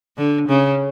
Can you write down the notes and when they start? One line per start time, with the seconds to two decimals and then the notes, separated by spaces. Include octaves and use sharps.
0.17 D3
0.48 C#3